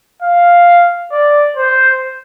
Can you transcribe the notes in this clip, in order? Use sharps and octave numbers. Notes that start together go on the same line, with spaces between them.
F5
D5
C5